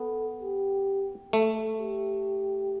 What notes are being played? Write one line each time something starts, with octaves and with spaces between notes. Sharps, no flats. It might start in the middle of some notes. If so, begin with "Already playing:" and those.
Already playing: B3 A4
G4
A3 A4
G4